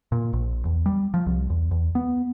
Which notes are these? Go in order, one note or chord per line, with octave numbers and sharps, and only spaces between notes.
A#2
A#1
E2
G3
F3
C2
E2
E2
B3